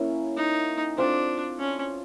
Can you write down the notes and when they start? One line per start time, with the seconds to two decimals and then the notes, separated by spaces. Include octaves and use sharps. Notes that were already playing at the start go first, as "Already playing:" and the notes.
Already playing: A#3 C#4 E4
0.37 D#4
0.98 C4 D4 F4 A4 D5
1.59 C#4